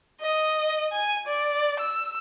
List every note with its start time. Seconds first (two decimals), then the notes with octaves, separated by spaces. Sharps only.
0.21 D#5
0.93 G#5
1.27 D5
1.79 E6